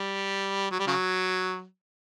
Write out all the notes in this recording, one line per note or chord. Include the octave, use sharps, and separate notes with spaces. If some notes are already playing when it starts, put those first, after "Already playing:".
Already playing: G3
F#3
G3
C#3 F#3